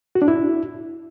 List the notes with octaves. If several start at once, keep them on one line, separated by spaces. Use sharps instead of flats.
F#4
D4
E4